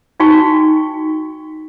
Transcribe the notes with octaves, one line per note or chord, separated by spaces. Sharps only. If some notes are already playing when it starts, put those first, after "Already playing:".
D#4 F#4 F5 G5 G#5 C#6